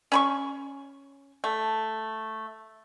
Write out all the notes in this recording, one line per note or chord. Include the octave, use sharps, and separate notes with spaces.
C#4 B5 C#6
A3